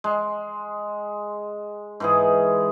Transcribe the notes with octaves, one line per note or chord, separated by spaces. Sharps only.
G#3
G#2 E3 G#4